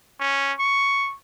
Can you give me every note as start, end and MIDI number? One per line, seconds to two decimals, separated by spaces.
0.20 0.53 61
0.59 1.15 85